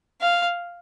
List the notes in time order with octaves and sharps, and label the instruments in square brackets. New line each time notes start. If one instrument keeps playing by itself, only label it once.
[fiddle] F5